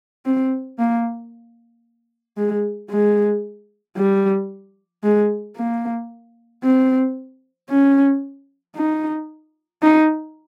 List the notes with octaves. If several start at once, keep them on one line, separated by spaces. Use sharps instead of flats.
C4
A#3
G#3
G#3
G3
G#3
A#3
C4
C#4
D#4
D#4